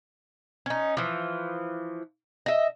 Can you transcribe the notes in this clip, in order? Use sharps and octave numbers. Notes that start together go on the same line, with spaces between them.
C#4 D#4
E3 F3
D#5 E5